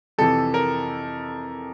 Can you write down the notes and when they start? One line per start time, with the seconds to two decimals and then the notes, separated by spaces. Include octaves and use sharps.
0.18 F2 C3 E3 A4
0.54 A#4